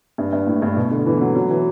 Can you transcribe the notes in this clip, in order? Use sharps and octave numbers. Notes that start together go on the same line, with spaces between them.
G2
G2
A2
G2
B2
D3
E3
F#3
F#3
E3